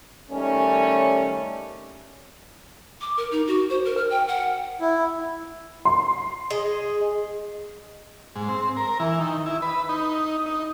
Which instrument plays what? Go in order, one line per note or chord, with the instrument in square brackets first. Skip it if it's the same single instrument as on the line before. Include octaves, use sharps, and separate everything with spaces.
[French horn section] D#3 G3 A3 C#4
[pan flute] D6
A#4
D#4
F#4
C5
A#4
F6
G5
F#5
[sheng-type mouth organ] E4
[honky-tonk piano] C6
[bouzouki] G#4 D#5
[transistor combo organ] G#2
C4
A#4
E3
D#3
E4
B4
D#4
D#4